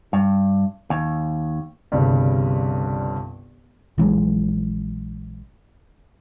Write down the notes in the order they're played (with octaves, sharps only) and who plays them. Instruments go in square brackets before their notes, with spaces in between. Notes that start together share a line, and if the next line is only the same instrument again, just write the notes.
[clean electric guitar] G2
D#2
[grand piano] G1 C2 G2 C#3
[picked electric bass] A#1 E3 F#3 G#3